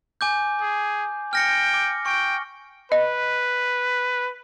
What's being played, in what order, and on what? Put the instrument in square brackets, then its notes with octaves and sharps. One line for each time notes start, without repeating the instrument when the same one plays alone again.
[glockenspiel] G#5 D6 G6
[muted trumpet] G#4
[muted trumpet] G5 [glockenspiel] F6 A#6 C#7
[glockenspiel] D6
[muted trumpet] G5 [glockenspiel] C#6
[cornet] B4 [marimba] D#5